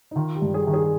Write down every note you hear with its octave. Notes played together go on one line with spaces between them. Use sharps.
D#4
D#3 F4
G4
G2
G#4
D#3
G#4